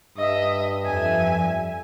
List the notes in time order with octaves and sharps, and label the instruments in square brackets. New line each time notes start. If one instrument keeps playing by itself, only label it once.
[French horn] G2 [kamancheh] D#5 E5
[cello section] F2 E5 [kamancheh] G#5